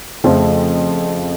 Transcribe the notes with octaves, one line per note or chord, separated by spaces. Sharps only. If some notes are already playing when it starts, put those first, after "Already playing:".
F2 C#3 F3 A3 C4